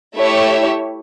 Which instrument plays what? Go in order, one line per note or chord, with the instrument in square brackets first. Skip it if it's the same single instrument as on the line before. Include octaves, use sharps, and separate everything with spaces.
[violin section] A3 E4 G4 C#5 E5